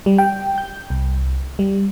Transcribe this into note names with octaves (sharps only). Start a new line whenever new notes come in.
G3
G5
G6
C2
G3